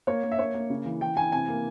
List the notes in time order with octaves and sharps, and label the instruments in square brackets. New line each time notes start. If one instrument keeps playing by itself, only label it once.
[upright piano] A#3 C#5
A#3
E5
A#3 C#5
A#3
C#3
E3
E3 G5
E3 G#5
C3 G#5
A#3